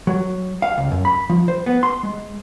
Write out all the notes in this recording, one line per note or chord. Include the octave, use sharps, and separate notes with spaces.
F#3
F5
C#2
F#2
B5
F3
C5
B3
C6
G#3